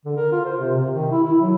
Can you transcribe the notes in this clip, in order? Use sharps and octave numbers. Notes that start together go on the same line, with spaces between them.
D3
A#4
F4
C5
C3
C3
D#3
E4
E4
F#3